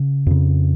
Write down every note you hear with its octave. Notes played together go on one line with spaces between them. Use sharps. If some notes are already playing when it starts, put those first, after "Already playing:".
Already playing: C#3
F2 C#3